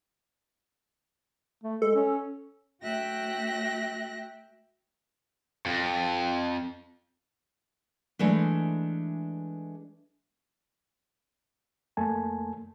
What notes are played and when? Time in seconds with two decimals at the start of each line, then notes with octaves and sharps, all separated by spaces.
1.64 A3
1.82 G#3 A4
1.95 C#4
2.83 A3 F#4 E5 G5 F#6 A#6
5.66 F2
8.19 E3 G#3 A3 D4
11.97 F2 A3 A#3 G#5 A5